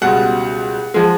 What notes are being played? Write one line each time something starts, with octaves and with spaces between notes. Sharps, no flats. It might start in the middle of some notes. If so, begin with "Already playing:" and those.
C#2 B2 G3 F#5
F3 G#3